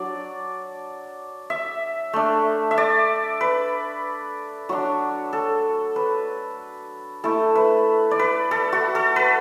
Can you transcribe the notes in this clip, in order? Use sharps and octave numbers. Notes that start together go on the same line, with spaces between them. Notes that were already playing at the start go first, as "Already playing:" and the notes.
Already playing: F#3 D4 D5
E5
A3 D4
E5
D5
B4
F#3 D4 F#4
A4
B4
A3 E4 A4
B4
D5
B4
A4
F#4
A4
B4